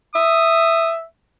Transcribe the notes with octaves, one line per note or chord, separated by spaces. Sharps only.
E5 D#6